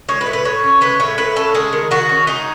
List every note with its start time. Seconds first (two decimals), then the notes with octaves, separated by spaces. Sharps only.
0.08 G#3 C#5
0.21 B4
0.26 A2
0.33 B4
0.45 A2 C#5
0.63 C#4
0.81 G#3 B4
1.00 A2 C#5
1.18 A2 B4
1.36 C#4 A4
1.54 G#3 G#4
1.73 D#3
1.91 D#3 F#4
2.09 C#4
2.27 G#3 D#4